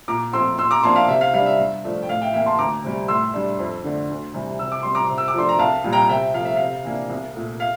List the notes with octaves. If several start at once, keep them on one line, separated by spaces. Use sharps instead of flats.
A#2 A#5 D6
F3 A3 C4 C6 E6
A#2 C6 E6
A#5 D6
F3 A#3 D4 A5 C6
F5 A5
C3 E5
F5
G3 D4 F5
E5
G2
F3 A3 D4
G5
A2 F5
E5 G5
E3 A#3 E5 G5
A5 C6
D2 A#5 D6
C3 G3
A2 C6 E6
G3 D4
F2
D3 A3 D4
D2
C3 E3 G3
C3 E6
D6
G3 C4 C6
A#5 D6
C3
E6
D6
F3 A3 D4 C6
A#5
C2 F5 A5
A#2 G3
G5 A#5
C3 E5 G5
F3 A3 F5
E5
C3 F5
E3 A#3 D4
C2
A#2 A3
F5